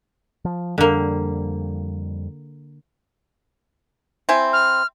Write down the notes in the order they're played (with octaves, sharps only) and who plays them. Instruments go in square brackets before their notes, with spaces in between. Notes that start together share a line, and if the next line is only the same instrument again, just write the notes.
[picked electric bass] F3
[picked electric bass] F2 G3 [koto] D3 A#3
[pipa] C4 E4 G#5
[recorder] F6